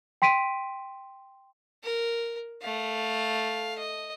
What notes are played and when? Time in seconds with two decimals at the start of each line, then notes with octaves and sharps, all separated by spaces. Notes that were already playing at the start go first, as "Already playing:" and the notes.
0.22 G5 C6 B6 D7 D#7
1.83 A#4
2.62 A3 F5
3.79 D#5